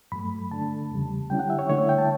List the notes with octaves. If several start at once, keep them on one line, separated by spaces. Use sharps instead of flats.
G2 F#3 A3 B5
D3 A3 D4 A5
E2 C#3 G3
D3 G3 C#4 E4 G5
F#5
E5
C#5
D3 A3 E4 C#5
E5
G5
A5